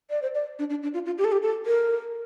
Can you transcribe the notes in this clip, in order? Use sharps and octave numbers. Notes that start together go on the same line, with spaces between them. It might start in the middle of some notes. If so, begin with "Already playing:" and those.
D5
C5
D5
D4
D4
D4
F4
F4
G4
A4
G4
A4
A#4